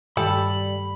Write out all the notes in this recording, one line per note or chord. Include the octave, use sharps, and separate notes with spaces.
G2 D#3 G3 G4 A4 B5